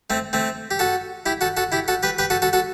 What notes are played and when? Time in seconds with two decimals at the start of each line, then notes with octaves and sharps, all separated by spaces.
0.10 A3 C4
0.33 A3 C4
0.71 G4
0.79 F#4 A4
1.26 E4 G4
1.41 F#4 A4
1.57 F#4 A4
1.72 E4 G4
1.88 F#4 A4
2.03 G4 B4
2.18 G4 B4
2.30 F#4 A4
2.42 F#4 A4
2.53 F#4 A4